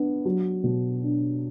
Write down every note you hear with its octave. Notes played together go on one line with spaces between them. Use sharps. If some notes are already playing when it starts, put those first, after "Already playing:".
Already playing: B3 D4
F#3
B2
D4